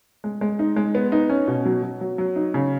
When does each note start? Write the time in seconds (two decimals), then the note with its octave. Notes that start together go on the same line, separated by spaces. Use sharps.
0.24 G#3
0.41 G#3
0.59 D#4
0.76 G#3
0.95 B3
1.12 D#4
1.29 C#4
1.48 B2
1.66 F#3
1.83 F#3
2.01 F#3
2.18 F#3
2.36 D#4
2.54 C#3